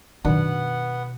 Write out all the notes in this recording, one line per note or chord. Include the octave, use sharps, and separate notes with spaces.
F#2 B2 D#3 B3 D4 F#5